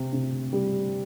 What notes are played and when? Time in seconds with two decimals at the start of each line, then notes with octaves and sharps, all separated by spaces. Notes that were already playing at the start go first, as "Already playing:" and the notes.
Already playing: C3
0.13 C3
0.53 G3